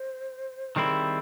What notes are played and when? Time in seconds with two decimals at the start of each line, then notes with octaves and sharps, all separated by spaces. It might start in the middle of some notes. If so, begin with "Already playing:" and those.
Already playing: C5
0.76 D#3 G3 C4 E4 G#4 A4